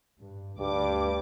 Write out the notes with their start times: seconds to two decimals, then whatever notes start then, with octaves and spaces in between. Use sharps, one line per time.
0.19 G2
0.60 D2 G2 G3 D6